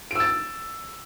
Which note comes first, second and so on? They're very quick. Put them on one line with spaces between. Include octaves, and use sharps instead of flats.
D7 E6 A6